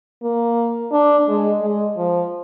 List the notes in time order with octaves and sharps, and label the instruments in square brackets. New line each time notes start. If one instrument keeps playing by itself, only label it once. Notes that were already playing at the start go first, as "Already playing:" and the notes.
[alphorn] A#3
D4
G#3
G#3
F3